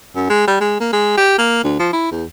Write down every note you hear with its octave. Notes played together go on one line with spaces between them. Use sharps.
F#2
G#3
G3
G#3
A#3
G#3
G4
A#3
D2
F3
E4
E2